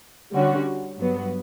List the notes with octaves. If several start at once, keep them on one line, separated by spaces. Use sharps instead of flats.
D3 G3 C#4 F#4
G2 F#3 B3